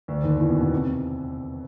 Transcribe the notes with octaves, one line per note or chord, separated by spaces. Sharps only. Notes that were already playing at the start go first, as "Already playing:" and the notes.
D2 D3
D#2 D#3
E2 E3
B2
B2
C3